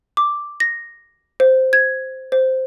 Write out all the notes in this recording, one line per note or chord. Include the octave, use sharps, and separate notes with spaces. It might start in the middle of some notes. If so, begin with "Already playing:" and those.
D6
A#6
C5
G#6
C5